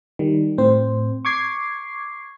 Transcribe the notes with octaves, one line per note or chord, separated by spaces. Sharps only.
D#3 G3
A2 C4 C5
C#6 D6 G#6 C7